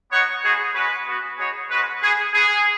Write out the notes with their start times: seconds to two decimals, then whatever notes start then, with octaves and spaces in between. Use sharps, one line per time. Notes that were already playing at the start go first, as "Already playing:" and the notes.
0.12 B3 D#4 F#4 C#5 F#5
0.44 B3 D#4 F#4 G#4
0.75 G#3 C#4 F#4 B4
1.07 B3 F#4
1.38 B3 D#4 F#4 G#4 C#5
1.70 G#3 C#4 F#4 B4
2.02 B3 F#4 G#4
2.34 B3 F#4 G#4